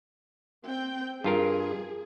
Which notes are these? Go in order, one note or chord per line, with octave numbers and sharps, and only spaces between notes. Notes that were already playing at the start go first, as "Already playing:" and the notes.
C4 G5
G2 F4 G#4 A#4